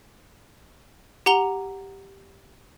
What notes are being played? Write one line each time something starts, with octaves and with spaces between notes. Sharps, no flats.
G4 F#5 A#5 F7 G7